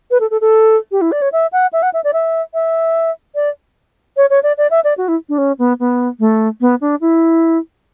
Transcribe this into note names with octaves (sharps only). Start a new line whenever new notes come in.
B4
A4
A4
A4
G4
E4
D5
C#5
E5
F#5
E5
F#5
E5
D5
E5
E5
D5
C#5
C#5
D5
D5
E5
D5
F#4
E4
D4
C#4
B3
B3
A3
B3
D4
E4